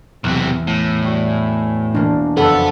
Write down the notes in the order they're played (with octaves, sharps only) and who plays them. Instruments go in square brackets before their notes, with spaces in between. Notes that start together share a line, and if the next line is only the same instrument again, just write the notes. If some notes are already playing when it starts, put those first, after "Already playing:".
[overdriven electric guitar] B1 C3 [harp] E2
[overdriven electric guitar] A2
[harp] G3 F#4
G#5
[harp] E1 A#3 [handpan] D4
[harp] F#1 F2 [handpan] A4 [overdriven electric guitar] B4 F#5